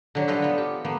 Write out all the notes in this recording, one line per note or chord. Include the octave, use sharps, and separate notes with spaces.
D3 F#3 G3
A4 B4 C5 D5 D#5 F5
B3 F4
G4
F3 A#3 B3